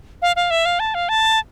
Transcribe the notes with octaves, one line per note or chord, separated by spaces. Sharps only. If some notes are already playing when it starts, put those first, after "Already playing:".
F5
F5
E5
F5
A5
F5
A5